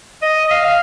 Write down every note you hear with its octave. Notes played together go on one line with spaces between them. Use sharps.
D#5
D#5
F5
F5